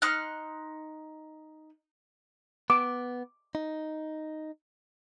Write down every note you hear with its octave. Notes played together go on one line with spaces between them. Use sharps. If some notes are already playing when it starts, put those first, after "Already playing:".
D#4 C6 F6 F#6
B3 D6
D#4